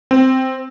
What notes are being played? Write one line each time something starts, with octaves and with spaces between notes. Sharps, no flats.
C4